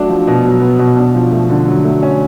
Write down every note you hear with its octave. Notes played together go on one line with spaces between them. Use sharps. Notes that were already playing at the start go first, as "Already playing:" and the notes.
Already playing: F#3 A3 D4 F#4
F3
B2
F#3
B3
B2
D4
F3
A3
D3
F#3
A3
C#4